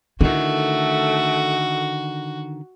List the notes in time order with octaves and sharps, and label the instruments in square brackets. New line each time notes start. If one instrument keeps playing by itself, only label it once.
[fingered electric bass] D3 D#3 [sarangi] A3 [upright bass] E4 [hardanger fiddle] F#4